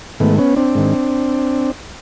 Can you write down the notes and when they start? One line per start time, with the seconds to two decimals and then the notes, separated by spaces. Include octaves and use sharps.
0.20 G#2 D#3 A3 B3
0.38 B3 C#4
0.56 C4 D4
0.75 G#2 D#3